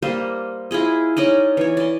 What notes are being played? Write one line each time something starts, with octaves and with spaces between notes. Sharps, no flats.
G3 A#3 C5 D#5
E4 F4 G#4 D#5
C#4 D#4 D5 D#5
E3 C#5
D5 D#5